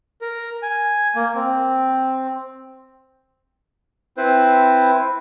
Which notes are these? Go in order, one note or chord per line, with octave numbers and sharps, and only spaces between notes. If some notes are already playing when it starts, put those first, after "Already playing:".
A#4
G#5
A#3
C4
C4 E4 B4 C5